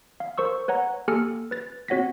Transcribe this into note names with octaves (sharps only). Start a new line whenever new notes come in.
F5
A#4 C5 C#6 E6
B4 C#5 F#5 A#5
A#3 G4 A4 G#5 F6 C#7
B4 A6
C4 F#4 C#5 F#5 A#6 B6